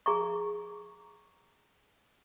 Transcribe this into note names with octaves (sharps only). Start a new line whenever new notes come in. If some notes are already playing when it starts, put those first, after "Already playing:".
G#4 A#5 C#6